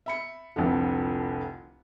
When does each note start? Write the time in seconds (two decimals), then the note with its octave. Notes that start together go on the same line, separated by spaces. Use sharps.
0.06 E5 B5 C#7
0.56 F1 C2 F2 D3